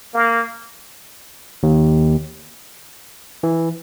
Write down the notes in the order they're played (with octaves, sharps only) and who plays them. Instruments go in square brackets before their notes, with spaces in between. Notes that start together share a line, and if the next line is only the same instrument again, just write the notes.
[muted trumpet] A#3
[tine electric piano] D#2
E3